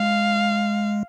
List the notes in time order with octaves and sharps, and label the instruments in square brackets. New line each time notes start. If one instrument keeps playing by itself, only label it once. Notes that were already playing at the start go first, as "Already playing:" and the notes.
Already playing: [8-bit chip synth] G#3 [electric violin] F5